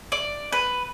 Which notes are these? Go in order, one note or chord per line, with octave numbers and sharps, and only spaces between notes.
D5
B4